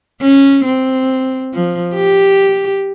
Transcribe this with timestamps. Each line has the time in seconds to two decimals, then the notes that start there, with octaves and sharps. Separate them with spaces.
0.21 C#4
0.65 C4
1.54 F3
1.95 G4